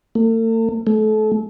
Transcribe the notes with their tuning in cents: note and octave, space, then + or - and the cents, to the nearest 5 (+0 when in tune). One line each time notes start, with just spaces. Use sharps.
A3 +45
A3 -30